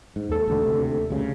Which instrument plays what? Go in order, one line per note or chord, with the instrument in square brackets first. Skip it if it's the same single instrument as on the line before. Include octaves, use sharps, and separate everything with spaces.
[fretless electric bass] G#2
[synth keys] D#2 A4
[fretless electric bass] E1 D2 D3
D2 C3
D2 G2 C#3